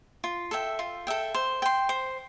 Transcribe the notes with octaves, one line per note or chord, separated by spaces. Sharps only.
F4
A4 E5 G5
F4
A4 E5 G5
C5
G5 C6
C5